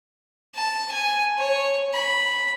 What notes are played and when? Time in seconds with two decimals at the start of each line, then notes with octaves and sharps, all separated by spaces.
0.55 A5
0.91 G#5
1.38 C#5
1.93 B5